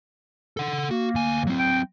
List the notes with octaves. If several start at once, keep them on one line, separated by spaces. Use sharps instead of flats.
A4 F#5
A#3 F#4
D2 G#5
F#3 C4
G5